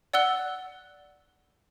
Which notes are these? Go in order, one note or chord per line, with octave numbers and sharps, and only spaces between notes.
D5 F#5 E6 F#6 G7